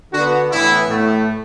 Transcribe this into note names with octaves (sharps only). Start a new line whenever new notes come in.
D3 B3 D4 F#4
A2 E3 B3 E4
A2 A3